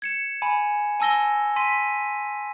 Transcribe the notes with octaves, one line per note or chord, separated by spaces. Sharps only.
G#6 C#7 E7
G#5 B5
G#5 A5 E6 A#6 G7
C6 B6 D#7